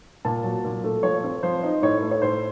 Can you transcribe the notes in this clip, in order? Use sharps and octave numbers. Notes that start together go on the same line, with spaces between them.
A#2 A5
F#3
A#2
A3
F3 C#5
C4
F3 C5
D#4
A2 C#5
A3
C#5
A2 C5